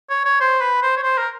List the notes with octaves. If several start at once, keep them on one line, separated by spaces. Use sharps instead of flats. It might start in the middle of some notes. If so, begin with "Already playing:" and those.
C#5
C#5
C5
B4
C5
C#5
C5
A#4